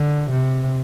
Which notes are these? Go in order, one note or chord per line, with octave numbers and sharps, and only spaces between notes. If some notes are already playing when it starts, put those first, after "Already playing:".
Already playing: D3
C3